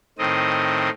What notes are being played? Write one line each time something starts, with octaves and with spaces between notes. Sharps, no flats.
A2 D#3 C4 D#5